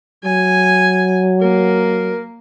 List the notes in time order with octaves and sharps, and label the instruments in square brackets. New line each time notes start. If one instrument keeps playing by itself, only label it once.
[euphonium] F#3 [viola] G#5
[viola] A#3 [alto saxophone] A#4